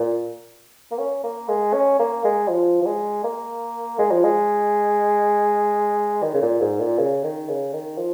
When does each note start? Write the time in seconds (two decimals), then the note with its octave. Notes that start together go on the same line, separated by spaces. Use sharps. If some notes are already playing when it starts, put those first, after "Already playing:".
Already playing: A#2
0.92 A#3
0.98 C#4
1.24 A#3
1.49 G#3
1.74 C#4
1.99 A#3
2.24 G#3
2.49 F3
2.82 F3
2.86 G#3
3.24 A#3
3.99 G#3
4.11 F3
4.24 G#3
6.23 D#3
6.34 C#3
6.42 A#2
6.61 G#2
6.80 A#2
6.99 C#3
7.24 D#3
7.49 C#3
7.73 D#3
7.98 F3